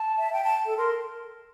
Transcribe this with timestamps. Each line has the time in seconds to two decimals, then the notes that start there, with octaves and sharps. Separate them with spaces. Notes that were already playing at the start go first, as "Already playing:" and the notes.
Already playing: A5
0.18 E5
0.33 G5
0.44 A5
0.66 A4
0.77 A#4 C6